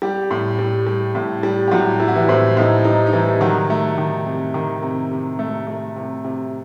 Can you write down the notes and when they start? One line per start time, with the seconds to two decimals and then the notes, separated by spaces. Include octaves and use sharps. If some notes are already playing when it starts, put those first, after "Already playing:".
0.02 G3 G4
0.31 A2
0.59 G3
0.87 G3
1.15 A2
1.43 G3
1.68 G4
1.71 A2 F#3 F#4
2.00 G3 E4
2.08 F#4
2.16 E3 E4
2.29 A2 C4
2.57 A2 D#4
2.84 G3 D#4
3.06 D#4
3.13 E3 G3 E4
3.41 D#3 F#3 F#4
3.70 A3
3.98 D#3
4.26 C3
4.54 D#3
4.82 C3
5.11 C3
5.39 A3
5.67 A3
5.96 C3
6.25 C3